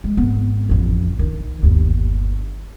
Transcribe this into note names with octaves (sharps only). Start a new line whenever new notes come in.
G#3
G#1 B3
A1 F2
D#3 D#4
G1 D#2